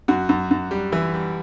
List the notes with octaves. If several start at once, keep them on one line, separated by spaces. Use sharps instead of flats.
F#2 F#4
F#2
F#2
G3
E3 E4
G3